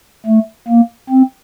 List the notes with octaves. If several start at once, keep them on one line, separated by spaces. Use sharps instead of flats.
A3
A#3
C4